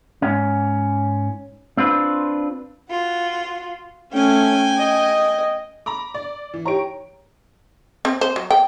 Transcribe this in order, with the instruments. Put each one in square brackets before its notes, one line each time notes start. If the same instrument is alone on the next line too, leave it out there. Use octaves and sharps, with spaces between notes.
[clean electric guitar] G#2 C#4
C4 D4 F4 B4
[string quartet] F4 F#4
[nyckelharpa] A3 C#4 [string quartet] G5 G#5
[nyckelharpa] D#5
[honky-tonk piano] A#5 B5 D6
D5
E3
[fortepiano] G4 C#5 A#5 [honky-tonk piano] C#6 D7
[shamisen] C4
C5
F#3
G5